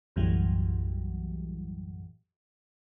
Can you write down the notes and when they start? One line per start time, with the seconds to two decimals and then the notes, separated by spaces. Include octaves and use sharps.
0.16 B1 F#2 A2 E3 F#3 G3